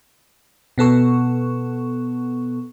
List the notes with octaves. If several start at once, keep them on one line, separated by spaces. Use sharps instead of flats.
B2 B3 A4 C#6